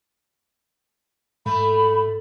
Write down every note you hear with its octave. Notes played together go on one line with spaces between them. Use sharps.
G#2 A3 B5